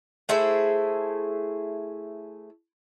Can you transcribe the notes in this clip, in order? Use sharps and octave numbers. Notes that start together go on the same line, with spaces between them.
A3 E4 G#4 C5